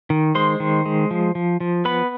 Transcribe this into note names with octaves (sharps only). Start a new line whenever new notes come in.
D#3
G#3 C5 C6
D#3
G#3
F3
F3
F3
B3 B4 B5